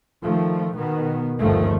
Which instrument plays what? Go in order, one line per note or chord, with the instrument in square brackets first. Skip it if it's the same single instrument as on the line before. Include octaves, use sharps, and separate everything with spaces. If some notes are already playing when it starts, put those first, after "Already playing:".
[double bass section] D#3 F3 A3
B2 D#3 B3
G1 D#2 G#2 D#3 F3 A3